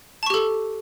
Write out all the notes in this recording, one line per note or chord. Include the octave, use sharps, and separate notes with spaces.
G4 A4 A5 C#6